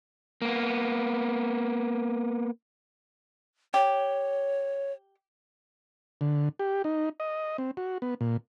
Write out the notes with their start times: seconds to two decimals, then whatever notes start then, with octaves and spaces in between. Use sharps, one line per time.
0.42 A#3 B3
3.74 G4 C#5
6.21 D3
6.59 G4
6.84 D#4
7.20 D#5
7.58 C4
7.77 F#4
8.02 B3
8.21 A#2